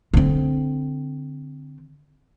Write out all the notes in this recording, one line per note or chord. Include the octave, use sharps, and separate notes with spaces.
D3 C4